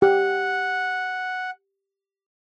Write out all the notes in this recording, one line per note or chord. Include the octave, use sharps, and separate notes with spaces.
G4 F#5